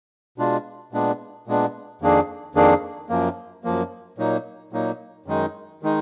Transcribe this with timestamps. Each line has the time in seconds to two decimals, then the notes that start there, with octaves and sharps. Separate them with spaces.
0.38 B2 G#3 D4 F4
0.93 A#2 G#3 B3 D4
1.47 A#2 G#3 B3 D4
2.02 F2 D#3 A#3 D4 G#4
2.55 F2 D#3 A#3 D4 G#4
3.09 F#2 F3 A#3
3.64 F#2 F3 A#3
4.18 A#2 F#3 A#3 D#4
4.72 A#2 F#3 A#3 D#4
5.26 F#2 D#3 G#3 D#4
5.83 D#3 G#3 D#4